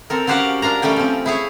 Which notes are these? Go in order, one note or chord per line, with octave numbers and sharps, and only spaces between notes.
C4 A4 A#4
C#4 F#4 G4 C5 F5 F#5
D4 F4 A#4 A#5
G3 A3 C#4 G5 G#5
F3 C4
E4 G#4 C#5